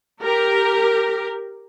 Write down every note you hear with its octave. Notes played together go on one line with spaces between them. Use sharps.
G4 A#4